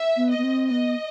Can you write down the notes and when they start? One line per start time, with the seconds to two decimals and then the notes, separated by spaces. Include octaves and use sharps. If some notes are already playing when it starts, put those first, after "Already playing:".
Already playing: E5
0.16 B3
0.30 D#5
0.38 B3
0.44 C4
0.70 B3 D#5